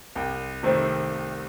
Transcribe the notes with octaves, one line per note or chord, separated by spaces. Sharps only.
C2 G5
C3 D#3 A3 C4